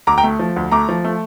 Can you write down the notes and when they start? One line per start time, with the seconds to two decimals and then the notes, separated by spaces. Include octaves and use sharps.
0.07 D2 A#5 D6
0.17 G5 A#5
0.24 A3
0.39 F3
0.56 D2
0.72 A3 A#5 D6
0.89 F3
1.04 A3